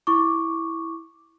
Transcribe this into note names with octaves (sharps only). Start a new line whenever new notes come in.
E4 C#6 D6